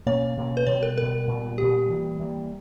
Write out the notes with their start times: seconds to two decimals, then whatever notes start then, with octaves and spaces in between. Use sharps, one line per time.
0.06 B2 A#3 C#4 C#5
0.37 B2 A#3 C#4
0.57 B4
0.67 B2 G3 B3 C#5
0.83 A#4
0.97 B2 G3 B3 A#4
1.27 A#2 G3 B3
1.58 A#2 G3 B3 G4
1.89 E3 G3 A#3
2.19 E3 G3 A#3